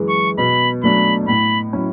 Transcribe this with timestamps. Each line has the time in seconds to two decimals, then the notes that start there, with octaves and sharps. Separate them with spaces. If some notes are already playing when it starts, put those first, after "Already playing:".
Already playing: F#2 E3 G#3
0.09 C#6
0.38 B2 B5
0.83 F#3 A3 D4 B5
1.28 A2 B5
1.73 F#3 C#4 E4